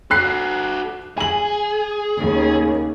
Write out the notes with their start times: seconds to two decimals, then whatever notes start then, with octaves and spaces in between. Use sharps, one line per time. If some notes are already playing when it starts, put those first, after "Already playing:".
0.11 F#4 A4 F#6 C7
1.18 G#4 G#5 F#7
2.18 D#2 C#3